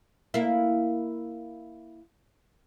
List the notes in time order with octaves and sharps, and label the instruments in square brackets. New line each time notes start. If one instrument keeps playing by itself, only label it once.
[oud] A#3 E4